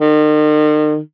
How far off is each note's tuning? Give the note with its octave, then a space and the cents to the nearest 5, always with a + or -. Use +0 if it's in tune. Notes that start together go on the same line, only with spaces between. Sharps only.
D#3 -40